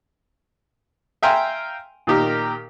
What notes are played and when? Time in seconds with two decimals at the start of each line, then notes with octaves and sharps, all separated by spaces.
1.23 E5 F5 G5 G#5 A#5 C6
2.07 A#2 D#3 G4 A#4